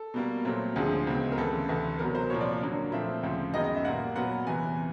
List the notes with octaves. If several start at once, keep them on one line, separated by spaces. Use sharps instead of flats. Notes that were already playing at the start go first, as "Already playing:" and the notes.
Already playing: A4
B2 G3 A#3
A#2 F#3 A3 C4
D2 D3 F3 G#3 G#4
C#2 B2 G#3 C4
A#4
D2 C#3 E3 A4
D2 C3 E3 A3
C2 B2 F#3 A#4
C5
C2 A#2 F3 C#5
D5
F2 D3 F#3 A#3
A#2 F3 A3 C4 E5
D2 C#3 F3
F#2 D#3 G#3 B3 D#5
D#5
E5
A#2 G3 A#3 F#5
A#2 F#3 B3 F#5
E2 C3 E3 G#5